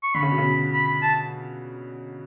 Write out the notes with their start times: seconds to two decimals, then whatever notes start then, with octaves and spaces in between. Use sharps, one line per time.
0.03 C#6
0.14 D3 B5
0.23 C#3
0.31 B2
0.38 C#3
0.73 B5
1.02 A5